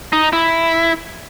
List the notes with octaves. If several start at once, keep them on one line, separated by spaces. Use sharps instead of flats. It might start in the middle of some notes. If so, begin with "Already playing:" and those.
D#4
E4